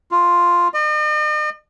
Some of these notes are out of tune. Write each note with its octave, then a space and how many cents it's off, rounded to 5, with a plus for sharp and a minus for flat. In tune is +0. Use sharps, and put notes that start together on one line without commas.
F4 +0
D#5 -45